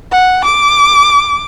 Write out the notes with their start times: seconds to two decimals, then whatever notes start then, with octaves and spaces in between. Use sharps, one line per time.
0.12 F#5
0.45 D6